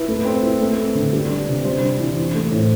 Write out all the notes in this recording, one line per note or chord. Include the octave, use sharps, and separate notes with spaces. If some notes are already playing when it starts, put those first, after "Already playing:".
Already playing: E4 B4
A3
C4
E4
A3
C4
D3
G3
D4
C3
G3 C5
D4
E3
E3
A3
A2